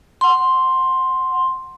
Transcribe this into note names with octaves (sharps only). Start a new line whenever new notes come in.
F#5 C6